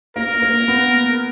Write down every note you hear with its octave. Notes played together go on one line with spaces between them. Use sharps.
A#3 A#4
A#3
B3